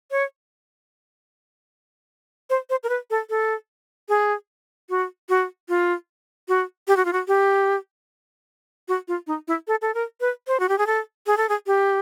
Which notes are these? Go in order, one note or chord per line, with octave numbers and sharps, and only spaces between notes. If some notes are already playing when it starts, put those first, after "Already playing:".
C#5
C5
C5
A#4
B4
A4
A4
G#4
F#4
F#4
F4
F#4
G4
F#4
F4
F#4
G4
F#4
F4
D#4
E4
A4
A4
A#4
B4
C5
F#4
G4
G#4
A4
G#4
A4
G#4
G4